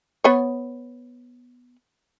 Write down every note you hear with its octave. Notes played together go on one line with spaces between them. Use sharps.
B3 C#5